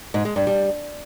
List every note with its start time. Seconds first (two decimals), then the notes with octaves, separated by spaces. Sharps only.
0.14 G#2
0.25 G#3
0.36 G2
0.47 G3